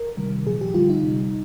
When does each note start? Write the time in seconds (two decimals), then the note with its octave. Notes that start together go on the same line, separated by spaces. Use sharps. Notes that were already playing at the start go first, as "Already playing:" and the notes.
Already playing: A#4
0.17 C3 D#3 G3
0.46 A#2 F3 G#4
0.61 G4
0.74 D3 G3 F4
0.89 D#4
1.03 C3 G3